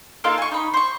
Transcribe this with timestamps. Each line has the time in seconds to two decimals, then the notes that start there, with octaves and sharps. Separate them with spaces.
0.24 A#3 D#4 F4 A4
0.38 G#5 C#6
0.51 D#4 B5
0.74 C5 C#6